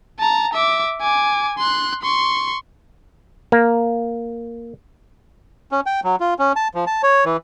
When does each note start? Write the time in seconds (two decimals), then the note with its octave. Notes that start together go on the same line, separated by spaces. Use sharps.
0.20 A5 A#5
0.53 E5 D6
1.01 G#5 D6
1.58 C6 F#6
2.02 C6 C#6
3.52 A#3
5.72 C#4
5.86 G5
6.04 F#3
6.20 F4
6.39 C#4
6.56 A5
6.75 F3
6.87 A5
7.03 C#5
7.25 E3